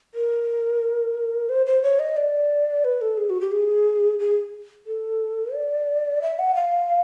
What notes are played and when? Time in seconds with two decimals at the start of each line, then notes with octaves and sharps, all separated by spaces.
0.14 A#4
1.49 C5
1.66 C5
1.83 C#5
1.99 D#5
2.17 D5
2.84 B4
3.01 A4
3.17 G#4
3.30 F#4
3.41 G4
3.52 G#4
4.19 G#4
4.87 A4
5.54 D5
6.22 E5
6.39 F#5
6.55 F5